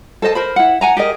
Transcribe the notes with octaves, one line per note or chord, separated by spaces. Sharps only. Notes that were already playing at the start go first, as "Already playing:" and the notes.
A4 C5 D#5 A5
A#4 C5 B5
E4 F#5
F#5 G#5 A#5
G4 G#4 A#4 D#5